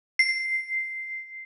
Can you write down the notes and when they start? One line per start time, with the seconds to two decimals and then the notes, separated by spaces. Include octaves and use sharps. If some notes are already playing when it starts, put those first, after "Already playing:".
0.19 C7